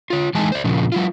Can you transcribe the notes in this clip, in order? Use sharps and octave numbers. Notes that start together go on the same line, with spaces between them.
F4 C#5
E3 G#3 D#4 G#4 A5
C5 D5
A#2 C#3 F3
F#3 E4 F4